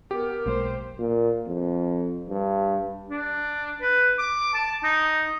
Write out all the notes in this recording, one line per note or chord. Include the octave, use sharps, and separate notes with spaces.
B3 G4 A#4
B1 G#3 A#3 C5
A#2
F2
G2
D4
B4
D6
A5
D#4